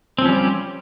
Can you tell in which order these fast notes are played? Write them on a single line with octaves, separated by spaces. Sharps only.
C4 F3 C#4 G3 G4